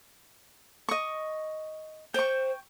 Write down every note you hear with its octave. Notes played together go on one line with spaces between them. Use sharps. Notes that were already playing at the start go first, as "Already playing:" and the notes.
D#5 C#6
C5 G5 C#6